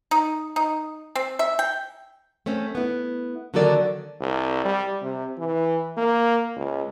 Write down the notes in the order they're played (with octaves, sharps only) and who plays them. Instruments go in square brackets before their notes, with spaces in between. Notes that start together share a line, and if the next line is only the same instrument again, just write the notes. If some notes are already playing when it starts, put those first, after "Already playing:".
[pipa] D#4
D#4
C4
E5
G5
[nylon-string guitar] A3 C4 C#4
B3 E4
D3 D#3 F#3 A#3 A4 D5
[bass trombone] C2
G3
C3
E3
A#3
C#2